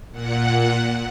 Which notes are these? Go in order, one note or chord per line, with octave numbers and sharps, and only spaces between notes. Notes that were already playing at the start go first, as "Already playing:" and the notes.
A#2 F#5